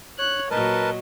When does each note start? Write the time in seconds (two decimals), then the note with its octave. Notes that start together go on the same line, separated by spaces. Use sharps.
0.19 C#5 F#6
0.51 A#2 F#3 A#4 B4 D#5 A5